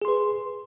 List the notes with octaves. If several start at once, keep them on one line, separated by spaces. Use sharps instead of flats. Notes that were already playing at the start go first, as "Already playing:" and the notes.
G#4 B4 C6